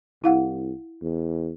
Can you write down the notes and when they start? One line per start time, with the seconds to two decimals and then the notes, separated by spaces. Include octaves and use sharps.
0.24 C2 E4 F5 F#5
1.02 E2